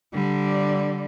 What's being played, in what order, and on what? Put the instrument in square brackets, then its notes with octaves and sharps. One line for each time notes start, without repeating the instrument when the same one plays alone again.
[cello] D3 G3